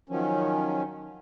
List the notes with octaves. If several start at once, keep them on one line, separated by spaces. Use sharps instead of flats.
D#3 F3 F#3 C#4